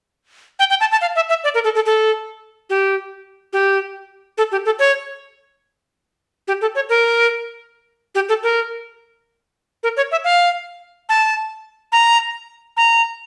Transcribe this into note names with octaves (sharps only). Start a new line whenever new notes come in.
G5
G5
A5
A5
F5
E5
E5
D5
A#4
A4
A4
A4
G4
G4
A4
G4
A4
C#5
G4
A4
C#5
A#4
G4
A4
A#4
A#4
C#5
E5
F5
A5
A#5
A#5